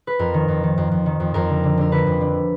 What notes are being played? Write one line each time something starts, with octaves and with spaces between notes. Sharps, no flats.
B4
F2 A#4
D#3
F2
D#3
F2
F2
D#3
F2
F2 A#4
D3
D3
D3 A#4
D3 B4
F2
D3